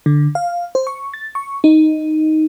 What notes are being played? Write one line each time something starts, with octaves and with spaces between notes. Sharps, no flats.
D3
F5
C5
C#6
A6
C#6
D#4